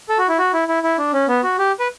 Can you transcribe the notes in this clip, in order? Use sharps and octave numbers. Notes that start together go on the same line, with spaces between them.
A4
F#4
E4
F#4
E4
E4
E4
D4
C#4
B3
F#4
G4
B4